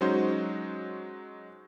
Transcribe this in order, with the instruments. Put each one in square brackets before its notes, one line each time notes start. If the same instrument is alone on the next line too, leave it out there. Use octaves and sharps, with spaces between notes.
[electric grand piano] F#3 G#3 C#4 D#4 F#4 C5